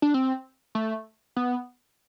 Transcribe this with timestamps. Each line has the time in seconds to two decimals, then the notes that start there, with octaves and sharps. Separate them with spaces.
0.02 D4
0.14 C4
0.75 A3
1.36 B3